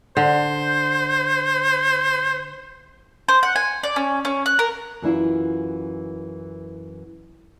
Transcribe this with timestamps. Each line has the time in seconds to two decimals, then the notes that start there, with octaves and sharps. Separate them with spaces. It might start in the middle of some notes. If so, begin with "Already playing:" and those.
0.17 D3 C5
3.28 C5
3.43 F#5
3.56 G#5
3.83 D5
3.96 C#4
4.25 C#4
4.46 F#6
4.59 A#4
5.02 F#2 E3 E4 F4